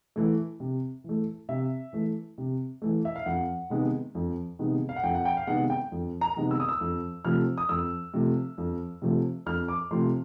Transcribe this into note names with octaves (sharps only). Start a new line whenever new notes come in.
E3 A3
C3
E3 A3
C3 E5
E3 A3
C3
E3 A3
E5
F5
F2 F#5
C3 D#3 G#3 B3
F2
C3 D#3 G#3 B3
F5
F#5
F2 G5
F#5
G5
F5
C3 D#3 G#3 B3 F#5
G5
F2
A#5
C3 D#3 G#3 B3
E6
D#6
E6
F2
C3 F3 A3 F6
D#6
F2 E6
C3 F3 A3
F2
C3 F3 A3
F2 F6
D6
C3 F3 A3 C6